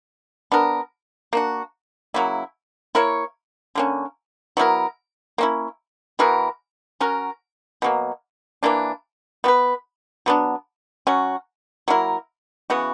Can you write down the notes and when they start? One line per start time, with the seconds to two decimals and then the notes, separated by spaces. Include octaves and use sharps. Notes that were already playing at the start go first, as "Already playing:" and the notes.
0.52 B3 D4 A#4
1.33 A#3 D4 F#4
2.14 C#3 F#3 A#3 E4
2.95 A#3 E4 A#4 C#5
3.75 D3 A#3 C#4
4.57 F#3 B3 E4 A#4
5.38 A#3 C#4 E4
6.19 E3 B3 F#4 A#4
7.00 F#3 C#4 F#4 A#4
7.82 B2 F#3 A#3
8.63 E3 A#3 D4
9.44 B3 F#4
9.48 B4
10.26 F#3 B3 D4
11.07 F#3 C#4 F#4
11.88 F#3 A#3 E4 A#4
12.70 C#3 E3 B3 F#4